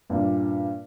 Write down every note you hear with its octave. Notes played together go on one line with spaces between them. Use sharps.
G2 A#2